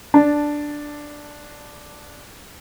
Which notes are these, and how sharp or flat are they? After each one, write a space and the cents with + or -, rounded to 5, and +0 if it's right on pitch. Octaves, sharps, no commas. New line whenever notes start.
D4 +0 A5 -5